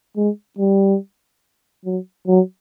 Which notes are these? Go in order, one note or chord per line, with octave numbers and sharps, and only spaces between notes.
G#3
G3
F#3
F#3